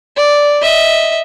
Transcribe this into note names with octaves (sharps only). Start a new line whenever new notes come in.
D5
D#5 E5